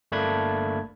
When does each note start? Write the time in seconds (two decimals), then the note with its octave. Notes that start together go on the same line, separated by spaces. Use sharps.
0.12 G1 A3 A#3 D4 B5 G#6